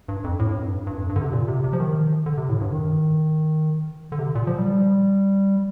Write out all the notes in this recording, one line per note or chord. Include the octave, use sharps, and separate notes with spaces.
G2
F2
A2
G2
F2
G2
G2
F2
G2
D3
C3
A#2
C3
C3
F3
D#3
D3
C3
A2
G2
D#3
D3
C3
D3
A#2
F3
G3